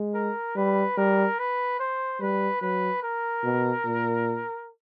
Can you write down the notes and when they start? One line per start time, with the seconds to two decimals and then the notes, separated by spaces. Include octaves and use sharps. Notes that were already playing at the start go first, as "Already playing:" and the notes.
Already playing: G#3
0.14 A#4
0.56 G3 B4
0.97 G3 A#4
1.39 B4
1.80 C5
2.20 G3 B4
2.61 F#3 B4
3.03 A#4
3.44 B2
3.85 A#2